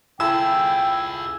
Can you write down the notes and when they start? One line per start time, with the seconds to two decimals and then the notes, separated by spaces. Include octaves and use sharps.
0.20 E4 F4 G#4 A4 G5 E6